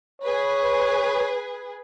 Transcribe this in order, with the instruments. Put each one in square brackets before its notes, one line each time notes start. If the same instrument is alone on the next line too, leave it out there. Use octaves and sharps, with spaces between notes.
[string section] G#4 B4 [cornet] C#5